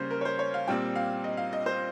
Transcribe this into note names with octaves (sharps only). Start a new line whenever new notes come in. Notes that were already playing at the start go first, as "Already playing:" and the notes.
Already playing: C#3 G3 A#3 C#4 C5
A#4
C#5
C5
C#5
F5
A#2 G3 C4 G5
F5
D#5
F5
D#5
C5